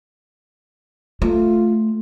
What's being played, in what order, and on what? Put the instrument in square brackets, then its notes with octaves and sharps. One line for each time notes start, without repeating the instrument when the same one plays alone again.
[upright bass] A3 [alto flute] F4